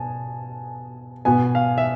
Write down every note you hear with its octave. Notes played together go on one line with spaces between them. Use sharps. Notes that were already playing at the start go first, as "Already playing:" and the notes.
Already playing: B2 B3 G#5 A5
B2 B3 G#5
F5
E5